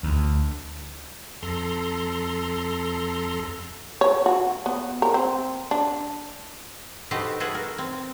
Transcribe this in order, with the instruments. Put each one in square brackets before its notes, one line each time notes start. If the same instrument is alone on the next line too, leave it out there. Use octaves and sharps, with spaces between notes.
[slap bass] D2
[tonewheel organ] F2 A4 A#5 C6
[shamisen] C#5
F#4
B3
A#4
C4
D4
[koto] D#4 F#4 G4 A4 B4 C5
F#4 G#4 A4 B4 C#5 F#5
A#4
C4